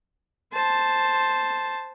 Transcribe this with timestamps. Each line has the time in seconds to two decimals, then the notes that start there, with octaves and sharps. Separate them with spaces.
0.53 C5 A5